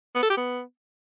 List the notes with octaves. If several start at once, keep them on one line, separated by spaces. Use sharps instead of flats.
B3
A4
G4
B3